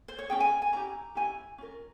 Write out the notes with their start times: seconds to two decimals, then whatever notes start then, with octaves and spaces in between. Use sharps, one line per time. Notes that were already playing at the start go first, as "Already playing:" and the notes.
0.08 C5
0.19 C#5
0.29 C#4 F4 G#4 G5
0.40 G#5
0.62 G#5
0.72 C#4 E4 G4 A#5
1.15 C#4 E4 G4 G#5
1.58 C#4 F4 A#4